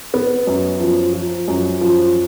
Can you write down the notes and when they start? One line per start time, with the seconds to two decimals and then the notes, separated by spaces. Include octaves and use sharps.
0.14 B3
0.47 F#2
0.80 F3
1.13 F3
1.48 F#2
1.81 F3